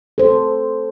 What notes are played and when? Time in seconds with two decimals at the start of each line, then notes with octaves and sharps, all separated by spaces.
0.18 A4 C5